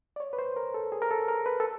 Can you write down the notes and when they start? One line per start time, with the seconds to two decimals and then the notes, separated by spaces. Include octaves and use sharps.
0.16 D5
0.20 C#5
0.33 B4
0.39 C5
0.56 A#4
0.74 A4
0.92 G#4
1.02 A#4
1.11 A4
1.28 A#4
1.46 B4
1.60 A4